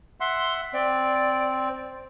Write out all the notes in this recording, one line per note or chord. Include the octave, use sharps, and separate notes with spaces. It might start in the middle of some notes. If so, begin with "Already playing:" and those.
E5 F#5 C6
C4 D5